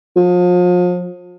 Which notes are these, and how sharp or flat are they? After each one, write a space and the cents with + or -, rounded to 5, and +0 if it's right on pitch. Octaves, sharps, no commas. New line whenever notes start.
F3 +35